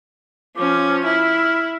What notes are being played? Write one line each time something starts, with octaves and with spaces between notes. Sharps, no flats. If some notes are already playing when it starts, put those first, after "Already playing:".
F3 C#4 D6
E4 F6